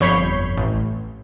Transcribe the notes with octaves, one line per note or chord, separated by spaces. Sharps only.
G1 F2 C#5 B5 G6 C7
A1